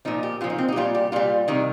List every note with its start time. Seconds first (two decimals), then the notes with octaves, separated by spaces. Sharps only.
0.05 A#2 F3 D#4
0.23 G4
0.41 A#2 F3 F4
0.50 D#4
0.58 C4
0.68 D#4
0.72 G4
0.76 A#2 G3 F4
0.95 G4
1.12 A#2 G3 F4
1.48 C3 D#3 G3 D#4